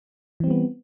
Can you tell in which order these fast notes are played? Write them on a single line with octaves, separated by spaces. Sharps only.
E3 C4 G3 B3